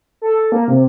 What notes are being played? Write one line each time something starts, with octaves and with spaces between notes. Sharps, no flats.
A4
A#3
C3